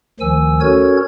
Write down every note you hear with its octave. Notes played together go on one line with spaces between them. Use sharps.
D2 D#3 F3 G#5 E6
C#4 F#4 A4 A#4 C#5 G#6